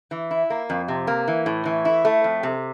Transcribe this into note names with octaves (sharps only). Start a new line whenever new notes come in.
E3
E4
A#3
F2
C3
A#3
E3
A2
E3
E4
A3
F2
C3